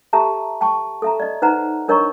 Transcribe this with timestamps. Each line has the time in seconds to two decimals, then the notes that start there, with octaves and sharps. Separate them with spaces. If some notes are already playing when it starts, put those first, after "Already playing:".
0.13 G4 A4 E5 A5 A#5
0.61 G5 A5 C#6
1.02 A4 E5 A#5
1.20 D5 D#5
1.42 D#4 B4 C5 F#5 A#5
1.88 D4 A#4 C#5 D#5 A#5 C#6